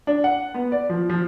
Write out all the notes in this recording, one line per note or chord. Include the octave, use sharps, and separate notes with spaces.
D4
F#5
B3
D5
F3
F3